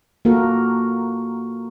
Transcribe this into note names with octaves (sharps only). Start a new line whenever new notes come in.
A#3 F4 F#4 A4 A#4